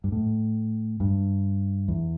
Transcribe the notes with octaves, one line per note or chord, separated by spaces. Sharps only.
G2
A2
G2
E2